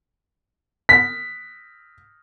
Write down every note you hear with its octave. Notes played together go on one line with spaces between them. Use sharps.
B6